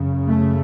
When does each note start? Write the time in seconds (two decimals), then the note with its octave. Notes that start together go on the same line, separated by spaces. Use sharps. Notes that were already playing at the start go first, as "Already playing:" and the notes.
Already playing: F#2 C#3
0.27 A3